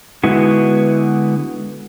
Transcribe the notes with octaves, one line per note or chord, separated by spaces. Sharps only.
D3 G#3 B3 E4 F#4